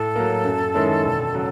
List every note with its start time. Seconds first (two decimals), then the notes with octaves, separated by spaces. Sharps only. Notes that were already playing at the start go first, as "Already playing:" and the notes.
Already playing: A2 A4
0.15 F#3 A#3
0.45 F#2
0.74 D#3 G#3 C#4 E4
1.05 E1
1.35 C#3 F#3